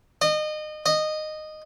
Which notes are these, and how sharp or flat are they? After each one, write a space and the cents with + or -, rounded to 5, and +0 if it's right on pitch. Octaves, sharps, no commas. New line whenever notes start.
D#5 -30
D#5 -15